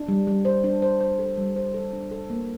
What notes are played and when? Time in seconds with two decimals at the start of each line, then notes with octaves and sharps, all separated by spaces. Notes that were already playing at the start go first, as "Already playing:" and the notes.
Already playing: D4
0.08 G3
0.27 G3
0.45 C5
0.64 D4
0.82 C5
1.01 C5
1.19 A4
1.37 G3
1.56 C5
1.74 A4
1.93 D4
2.11 A4
2.30 A#3